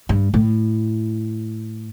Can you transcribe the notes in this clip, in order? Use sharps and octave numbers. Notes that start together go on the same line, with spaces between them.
G2
A2